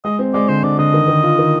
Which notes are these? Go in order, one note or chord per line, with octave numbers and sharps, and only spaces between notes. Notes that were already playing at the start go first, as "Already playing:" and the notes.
G#3 D#5
C4
G#3 D5
D3 C5
D3 D5
D3 D#5
D#3
D#3
F4
D#3